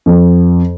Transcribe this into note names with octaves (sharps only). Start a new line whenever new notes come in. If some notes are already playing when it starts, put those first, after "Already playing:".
F2